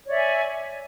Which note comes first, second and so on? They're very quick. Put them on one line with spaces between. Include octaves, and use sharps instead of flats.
C#5 D5 E5 G#5